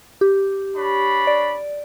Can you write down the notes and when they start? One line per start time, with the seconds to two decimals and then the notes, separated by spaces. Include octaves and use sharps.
0.21 G4
0.77 D4 C#5 B5
1.27 D5